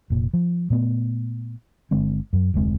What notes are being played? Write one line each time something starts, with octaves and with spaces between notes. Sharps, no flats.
F1 A#2
F3
A#2 A3 B3
G1 D3 G#3 C4
F#2 F#3
F1 D2 G#3 C4